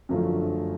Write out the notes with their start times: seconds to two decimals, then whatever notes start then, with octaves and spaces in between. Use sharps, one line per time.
0.09 F#2 D3 F3 A3